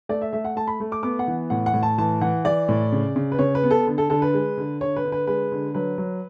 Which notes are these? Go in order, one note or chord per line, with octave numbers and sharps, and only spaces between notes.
A3 D5
E5
A3 E5
F#5
A3 A5
B5
A3
D6
B3 D6
F#5
E3
A2 F#5
F#5
A2
A5
E3 A5
E3 F#5
E3 D5
A2
C#3
C#3
B4
C#3 C#5
B4
B3
A4
D3
A4
D3 A4
B4
G#3
D3
D3 C#5
B4
D3
B4
G#3 B4
D3
F#3 B4
F#3